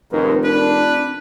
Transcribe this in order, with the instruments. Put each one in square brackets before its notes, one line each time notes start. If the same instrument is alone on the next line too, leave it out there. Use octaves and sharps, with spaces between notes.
[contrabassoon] F1 [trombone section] D#2 G#2 A#4 [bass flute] B4
[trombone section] D4 [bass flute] A#4 [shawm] B4
[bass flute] C4